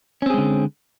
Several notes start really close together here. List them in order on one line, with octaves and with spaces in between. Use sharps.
C#4 C4 G#4 G#3 D3